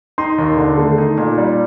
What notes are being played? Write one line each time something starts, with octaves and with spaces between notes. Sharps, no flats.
D#4 C6
D#2
D3
A3
D#4
A#2
G3